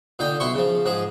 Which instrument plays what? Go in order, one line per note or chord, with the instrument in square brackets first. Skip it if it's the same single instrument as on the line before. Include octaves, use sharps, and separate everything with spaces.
[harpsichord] A#2 D3 D#4 G5
B1 E4 C6 C#6
C#3 F3
G#2 F3 G#4